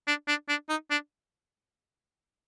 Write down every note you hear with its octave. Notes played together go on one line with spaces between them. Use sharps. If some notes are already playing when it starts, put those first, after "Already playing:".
D4
D4
D4
D#4
D4